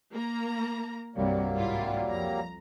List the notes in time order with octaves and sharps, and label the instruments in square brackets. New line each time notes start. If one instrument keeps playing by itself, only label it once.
[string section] A#3 A#5
[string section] C2 G2 [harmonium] F#3 G3 A#3
[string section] G#1 E4 F4
F2 A#5